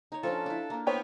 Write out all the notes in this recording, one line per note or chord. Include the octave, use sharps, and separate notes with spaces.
D#4 C#5
F3 C#4 D4 A4
D4 E4
A#3 D4
B3 C5 C#5 G5